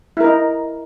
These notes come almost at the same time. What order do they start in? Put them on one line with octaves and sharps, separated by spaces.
E4 A#4 D#4